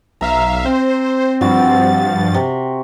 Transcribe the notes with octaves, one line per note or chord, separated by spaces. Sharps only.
B1 E5 F5 A#5
C4 C5
G2 F3 F#4 B5 A6
C3